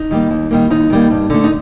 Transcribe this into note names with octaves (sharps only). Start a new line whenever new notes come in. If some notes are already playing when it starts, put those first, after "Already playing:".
Already playing: D#4
D#3 G3 A#3
D#2
D#3 G3 A#3
D#2 D#4
D#3 G3 A#3
G2
D3 A3
D#4